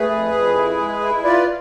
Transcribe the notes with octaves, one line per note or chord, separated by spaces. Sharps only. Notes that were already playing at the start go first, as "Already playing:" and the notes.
Already playing: A3 G#4 B4
F2
F2
E4
G#3
E4
F4 B4 D5